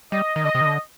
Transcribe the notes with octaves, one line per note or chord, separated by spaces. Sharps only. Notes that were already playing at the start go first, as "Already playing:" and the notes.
G3 D#5
D#3
D3 D#5
C3
D#3
D3